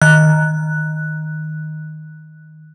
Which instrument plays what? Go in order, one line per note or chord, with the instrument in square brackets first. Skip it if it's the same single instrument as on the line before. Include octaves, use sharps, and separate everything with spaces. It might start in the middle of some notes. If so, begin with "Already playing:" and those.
[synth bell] D#3 F#6